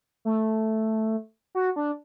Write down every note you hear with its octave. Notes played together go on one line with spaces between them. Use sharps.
A3
F#4
D4